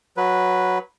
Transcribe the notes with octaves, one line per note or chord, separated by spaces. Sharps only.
F#3 B4